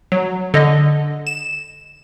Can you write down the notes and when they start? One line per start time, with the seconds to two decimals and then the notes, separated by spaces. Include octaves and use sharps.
0.12 F#3
0.54 D3 D#5
1.27 E7